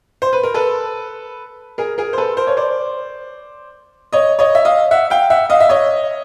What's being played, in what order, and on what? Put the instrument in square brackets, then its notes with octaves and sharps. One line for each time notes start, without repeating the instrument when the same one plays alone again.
[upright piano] C5
B4
A#4
A4 B4
G#4 A#4
G#4 A#4
C5
A4 B4
A#4 C5
C#5
C5 D5
C#5 D#5
C#5 D#5
E5
D#5 F5
E5 F#5
F5 G5
E5 F#5
D#5 F5
E5
C#5 D#5